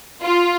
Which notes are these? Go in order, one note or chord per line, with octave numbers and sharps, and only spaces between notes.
F4